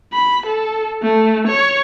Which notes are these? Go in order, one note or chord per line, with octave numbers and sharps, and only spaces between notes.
B5
A4
A3
C#5